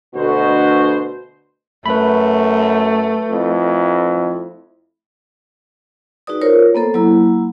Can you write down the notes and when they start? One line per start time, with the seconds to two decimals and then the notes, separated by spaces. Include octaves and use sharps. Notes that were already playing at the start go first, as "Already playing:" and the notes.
0.15 D2 B2 F#4 C5
1.86 F#2 A3 B4 B5
3.31 F2 E4
6.27 D#4 F#4 G#4 B4 D5 D#6
6.42 F4 A#4 C5 C#5
6.75 A#3 B3 A4 C5
6.94 F#3 A#3 E4